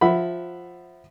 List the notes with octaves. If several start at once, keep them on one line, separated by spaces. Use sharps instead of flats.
F3 E5 F#5 B5